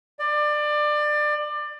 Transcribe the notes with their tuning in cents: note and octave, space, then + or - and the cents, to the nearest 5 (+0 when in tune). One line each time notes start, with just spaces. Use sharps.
D5 +25